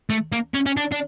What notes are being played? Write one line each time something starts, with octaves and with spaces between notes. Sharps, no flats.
A3
A#3
C#4
C#4
D4
D4